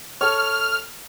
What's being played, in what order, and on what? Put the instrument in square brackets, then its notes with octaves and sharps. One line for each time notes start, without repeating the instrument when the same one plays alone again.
[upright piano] A4 C#5 [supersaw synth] F6